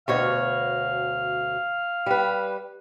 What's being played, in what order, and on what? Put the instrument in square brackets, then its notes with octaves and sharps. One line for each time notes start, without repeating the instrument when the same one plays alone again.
[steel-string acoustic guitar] D2 B2 C#5 [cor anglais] F5
[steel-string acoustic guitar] G3 B4